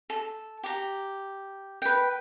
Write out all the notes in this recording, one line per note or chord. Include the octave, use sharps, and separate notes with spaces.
A4
G4 A#5
B4 G5